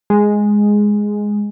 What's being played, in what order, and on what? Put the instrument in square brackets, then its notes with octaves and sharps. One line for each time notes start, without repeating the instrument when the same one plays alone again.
[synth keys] G#3